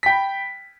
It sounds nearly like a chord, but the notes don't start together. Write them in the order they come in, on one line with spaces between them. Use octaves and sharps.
B6 G5 B5